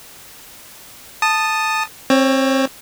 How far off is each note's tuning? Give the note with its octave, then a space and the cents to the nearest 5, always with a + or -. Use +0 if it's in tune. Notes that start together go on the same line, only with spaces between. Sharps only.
A5 +0 D#6 -10
C4 +25 C#5 +0